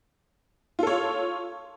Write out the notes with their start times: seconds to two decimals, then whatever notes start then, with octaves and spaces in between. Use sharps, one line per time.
0.79 F4
0.83 A4
0.87 C#5